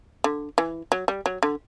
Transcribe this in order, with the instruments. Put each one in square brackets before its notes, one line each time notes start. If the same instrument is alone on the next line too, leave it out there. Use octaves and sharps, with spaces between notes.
[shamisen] D3
E3
F#3
G3
F#3
D3